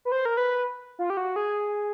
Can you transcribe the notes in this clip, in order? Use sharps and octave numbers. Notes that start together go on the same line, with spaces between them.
B4
C5
A#4
B4
F4
G4
F#4
G#4